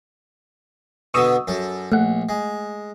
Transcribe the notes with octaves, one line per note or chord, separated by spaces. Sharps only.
B2 D3 B3 C#6 D#6 E6
F#2 A4
A#1 A3 F#5
G#3